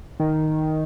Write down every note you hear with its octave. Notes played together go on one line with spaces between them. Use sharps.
D#3